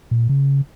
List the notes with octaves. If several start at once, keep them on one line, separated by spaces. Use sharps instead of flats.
A#2
C#3